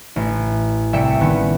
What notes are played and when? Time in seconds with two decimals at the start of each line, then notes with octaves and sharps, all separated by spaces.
0.16 A1
0.93 C2 E5 G5 C#7
1.21 D#3 A3 B3 C#4